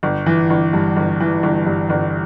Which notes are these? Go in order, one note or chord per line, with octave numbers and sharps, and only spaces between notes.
G1
E3
G1
G2
G1
E3
G1
G2
G1